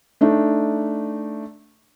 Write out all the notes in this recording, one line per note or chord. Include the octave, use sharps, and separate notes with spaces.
A3 D4 D#4